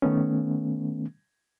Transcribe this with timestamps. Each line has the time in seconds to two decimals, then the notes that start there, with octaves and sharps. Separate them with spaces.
0.02 D#3 A3 B3 C#4